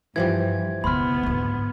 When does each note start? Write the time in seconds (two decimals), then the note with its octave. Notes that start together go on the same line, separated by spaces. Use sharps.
0.16 G2 E3 F3 G4 G#6
0.84 E1 C#3 B3 B5 C6 F6
1.23 D2 G#2